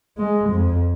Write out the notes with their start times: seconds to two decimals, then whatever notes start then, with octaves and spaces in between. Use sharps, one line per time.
0.17 G#3
0.50 F2